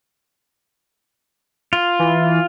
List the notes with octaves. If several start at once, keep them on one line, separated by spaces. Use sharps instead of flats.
F4
E3